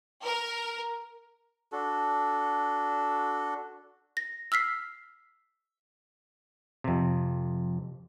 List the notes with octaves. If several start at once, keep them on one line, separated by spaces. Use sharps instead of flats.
A#4
D4 F#4 A4
A#6
E6 F6 B6 C7
F2 C3